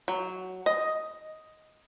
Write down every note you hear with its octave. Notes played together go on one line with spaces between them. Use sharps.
F#3
D#5